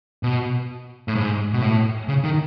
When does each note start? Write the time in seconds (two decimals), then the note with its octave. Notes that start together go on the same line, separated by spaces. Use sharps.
0.23 B2
1.08 A2
1.15 G#2
1.53 B2
1.62 A2
2.08 C#3
2.24 D#3